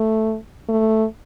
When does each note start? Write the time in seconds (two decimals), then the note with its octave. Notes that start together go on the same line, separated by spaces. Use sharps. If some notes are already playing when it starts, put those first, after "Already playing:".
Already playing: A3
0.69 A3